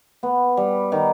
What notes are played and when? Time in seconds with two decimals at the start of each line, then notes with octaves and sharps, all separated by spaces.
0.23 B3
0.57 G3
0.92 D#3